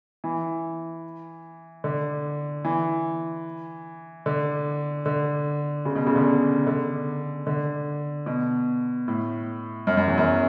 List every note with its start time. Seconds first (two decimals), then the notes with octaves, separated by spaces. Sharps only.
0.24 E3
1.84 D3
2.65 E3
4.26 D3
5.06 D3
5.85 C#3
5.95 B2
6.07 C#3
6.16 D3
6.67 D3
7.47 D3
8.26 B2
9.08 A2
9.87 F#2
9.97 F#2
10.08 E2
10.18 F#2